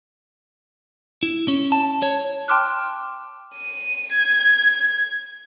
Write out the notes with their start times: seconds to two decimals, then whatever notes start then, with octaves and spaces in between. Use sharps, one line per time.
1.23 E4
1.48 C#4
1.72 A5
2.02 C#5
2.48 G5 A5 C6 D6 F6 F#6
3.56 D#7
4.13 G#6